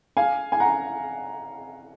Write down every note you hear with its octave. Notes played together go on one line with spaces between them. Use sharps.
F5 G#5
G#5
F#5 A#5